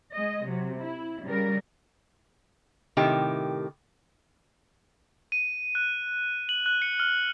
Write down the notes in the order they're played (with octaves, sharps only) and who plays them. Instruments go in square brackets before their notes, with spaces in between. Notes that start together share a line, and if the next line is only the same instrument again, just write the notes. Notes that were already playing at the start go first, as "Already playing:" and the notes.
[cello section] G#3 D#5
C3 F#3
E4
C#3 G3 A#4
[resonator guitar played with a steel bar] A2 C3 D#3 G4
[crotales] D#7
F#6
F#7
F#6
C#7
F6